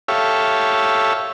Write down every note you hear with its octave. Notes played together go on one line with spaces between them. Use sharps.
G4 A4 C#5 E5 F5